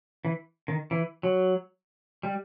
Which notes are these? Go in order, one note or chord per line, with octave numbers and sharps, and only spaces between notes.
E3
D#3
E3
F#3
G3